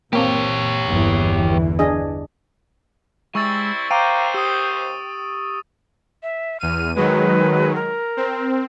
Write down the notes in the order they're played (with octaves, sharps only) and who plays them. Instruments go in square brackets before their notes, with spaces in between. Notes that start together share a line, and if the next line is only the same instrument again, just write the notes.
[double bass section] A#2 [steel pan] A#3 C4 [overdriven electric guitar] G4 C#5
[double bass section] G1 E2 E3
[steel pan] D4 G#4 D#5
[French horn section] G3 C4 E4 [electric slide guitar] G#3 [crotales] C#6 E6 A6
[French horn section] D#2 C5 [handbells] F5 A#5 D6 [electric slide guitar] G5 [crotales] D#7
[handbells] G4 [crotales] D#6 E6
[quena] E5
[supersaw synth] E2 D#7 [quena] F6
[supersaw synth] D#3 F#3 G#3 [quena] B4
[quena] A#4
[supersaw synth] C4